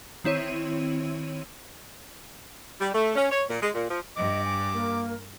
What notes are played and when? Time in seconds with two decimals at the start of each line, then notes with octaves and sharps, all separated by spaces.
0.24 D#3 C4 E4 C#5 D#7
2.80 G3
2.94 A3
3.15 C#4
3.31 C#5
3.49 A#2
3.61 G#3
3.74 A#2
3.89 F3
4.16 G2 D#5 D6
4.45 G#5
4.74 A#3 A#4